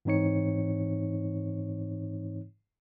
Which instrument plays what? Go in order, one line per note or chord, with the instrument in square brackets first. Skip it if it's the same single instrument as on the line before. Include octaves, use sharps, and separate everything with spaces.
[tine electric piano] G#2 E3 C4 D#4 C#5 C#7